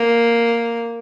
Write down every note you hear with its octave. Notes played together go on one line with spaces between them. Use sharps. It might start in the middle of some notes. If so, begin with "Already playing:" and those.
Already playing: A#3